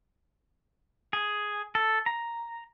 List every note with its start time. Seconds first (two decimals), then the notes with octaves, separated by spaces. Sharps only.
1.13 G#4
1.75 A4
2.06 A#5